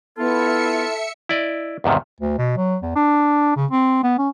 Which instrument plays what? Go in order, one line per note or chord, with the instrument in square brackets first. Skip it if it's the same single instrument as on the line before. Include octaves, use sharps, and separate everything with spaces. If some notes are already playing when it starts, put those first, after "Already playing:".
[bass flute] B3 [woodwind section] E4 F4 [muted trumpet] A4 [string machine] E5 C#7
[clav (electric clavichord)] E4 D5 D#5
E2 G#2 C3 D#3
[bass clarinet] D2
B2
F#3
E2
D4
C#3
C4
B3
C#4